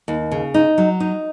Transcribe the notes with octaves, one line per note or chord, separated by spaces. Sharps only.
D#2
C#3
D#4
F#3
D#4